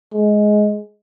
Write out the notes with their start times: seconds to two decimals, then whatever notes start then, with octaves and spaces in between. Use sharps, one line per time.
0.13 G#3